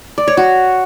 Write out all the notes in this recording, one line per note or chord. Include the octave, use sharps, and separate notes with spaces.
D5
C#5
F#4